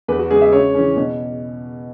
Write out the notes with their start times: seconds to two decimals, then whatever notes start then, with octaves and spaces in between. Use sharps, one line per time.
0.08 E2 B4
0.19 F#4
0.31 C#3 G#3 G#4
0.42 E5
0.52 C#3 C#5
0.75 E3 C#4
0.96 B2